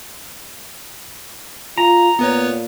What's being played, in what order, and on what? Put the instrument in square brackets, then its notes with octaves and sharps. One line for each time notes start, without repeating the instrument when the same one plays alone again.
[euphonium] F4 [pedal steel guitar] A#5
[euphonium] A#2 [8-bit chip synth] B3 B4 C#5